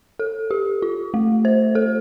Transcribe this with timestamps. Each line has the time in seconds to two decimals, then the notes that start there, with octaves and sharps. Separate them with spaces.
0.19 A4
0.51 G4
0.82 F4
1.14 A3
1.45 C5
1.75 A4